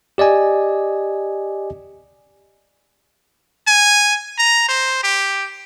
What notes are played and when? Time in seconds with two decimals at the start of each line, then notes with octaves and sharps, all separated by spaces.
0.18 G4 D5 D#5 G#5
3.67 G#5
4.38 A#5
4.68 C5
5.03 G4